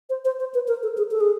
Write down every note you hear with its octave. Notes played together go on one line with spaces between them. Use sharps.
C5
C5
C5
B4
A#4
A4
G#4
A4
G#4